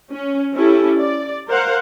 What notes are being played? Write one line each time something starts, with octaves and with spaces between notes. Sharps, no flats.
C#4
C#4 E4 G4 A4
D5
A#4 C5 F5 F#5